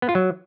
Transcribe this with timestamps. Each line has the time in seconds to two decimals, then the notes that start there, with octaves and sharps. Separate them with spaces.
0.02 B3
0.09 F4
0.15 F#3